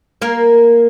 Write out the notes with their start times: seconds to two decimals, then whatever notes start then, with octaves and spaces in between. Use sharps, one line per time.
0.22 A#3 A#4